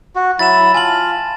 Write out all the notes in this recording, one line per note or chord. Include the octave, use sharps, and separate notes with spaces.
F#4
F#3 E4 B5 A6 E7
F4 G#5 A5 F#7